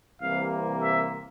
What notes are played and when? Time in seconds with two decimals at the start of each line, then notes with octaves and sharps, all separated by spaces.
0.20 C2 C3 E3 A#3 F5
0.81 E5